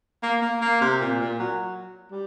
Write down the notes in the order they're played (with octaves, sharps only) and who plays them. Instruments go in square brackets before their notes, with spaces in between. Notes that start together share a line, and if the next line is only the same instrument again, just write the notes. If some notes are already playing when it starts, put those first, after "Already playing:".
[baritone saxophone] A#3
A#3
A#3
C3
A#2
A#2
F#3
G3